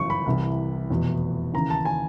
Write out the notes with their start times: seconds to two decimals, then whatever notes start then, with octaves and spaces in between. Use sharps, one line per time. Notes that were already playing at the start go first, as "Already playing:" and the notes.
Already playing: G1 F#2 C#3 E3 C#6
0.10 B5
0.26 C2 C3 E3
0.90 F1 E2 B2
1.53 D#2 C#3 E3 A#5
1.70 A5
1.85 G#5